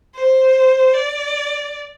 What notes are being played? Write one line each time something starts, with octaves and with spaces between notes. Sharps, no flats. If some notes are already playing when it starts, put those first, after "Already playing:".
C5
D5